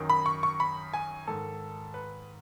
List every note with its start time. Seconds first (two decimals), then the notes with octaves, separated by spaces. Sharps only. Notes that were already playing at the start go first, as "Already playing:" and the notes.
Already playing: F#2 D#3
0.09 B5
0.26 C#6
0.43 C#6
0.60 B5
0.94 G#5
1.27 G#2 D#3 A4
1.94 B4